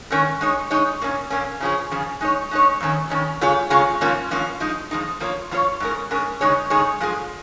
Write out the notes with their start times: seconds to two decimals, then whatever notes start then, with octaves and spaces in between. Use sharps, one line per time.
0.11 G#2 D#3 C#4 A#4 C#5
0.41 G#3 D#4 C#5
0.71 G#3 D#4 C#5
1.01 A#2 A#3 C#4
1.30 A#2 A#3 C#4
1.60 C#3 F3 C#4 G#4
1.91 C#3 F3 C#4 G#4
2.21 G#3 D#4 C#5
2.51 G#3 D#4 C#5
2.80 F2 D#3 C#4
3.10 F2 D#3 C#4
3.41 C#3 G#3 F4 G#4 C#5
3.70 C#3 G#3 F4 G#4 C#5
4.01 G#2 F3 A#3 C#4 F4
4.31 G#2 F3 A#3 C#4 F4
4.60 F3 G#3 D#4
4.91 F3 G#3 D#4
5.20 F3 A#3 F4 C#5
5.51 F3 A#3 F4 C#5
5.80 G#2 G#3 C#4 A#4
6.11 G#2 G#3 C#4 A#4
6.40 C#3 G#3 D#4 G#4 C#5
6.70 C#3 G#3 D#4 G#4 C#5
7.00 F3 G#3 F4 G#4